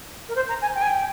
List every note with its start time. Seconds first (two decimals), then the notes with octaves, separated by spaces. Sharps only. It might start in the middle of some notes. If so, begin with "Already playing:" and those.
0.29 A#4
0.36 C5
0.49 A#5
0.62 G#5
0.75 G5
0.82 G#5
0.88 G5